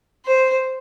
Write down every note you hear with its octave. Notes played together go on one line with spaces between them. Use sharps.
C5